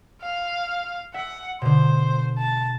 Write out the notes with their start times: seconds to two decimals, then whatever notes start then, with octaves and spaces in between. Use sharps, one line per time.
0.22 F5
1.14 E5 F#5
1.62 B2 D3 C5
2.38 A5